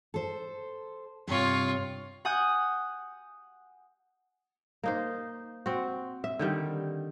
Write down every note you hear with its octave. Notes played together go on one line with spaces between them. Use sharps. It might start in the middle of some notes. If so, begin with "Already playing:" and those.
A4 C5
G2 C3 F4 C#5
F#5 G#5 D#6 F#6 G6
A#3 D#4 C5
C4 F#4
E5
D3 D#3 G3